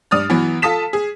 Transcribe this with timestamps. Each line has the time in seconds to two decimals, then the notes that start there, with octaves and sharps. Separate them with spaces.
0.11 G2 D5 D#6 F6 A6
0.30 E3 F#3 B3
0.62 F4 A4 A5 D#6 B6 E7
0.93 G#4